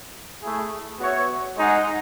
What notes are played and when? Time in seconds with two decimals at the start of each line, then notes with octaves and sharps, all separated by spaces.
0.42 A3 E4 G#4
0.99 B3 F#4 C#5 E5
1.57 G#3 D#4 G#4 D#5 F#5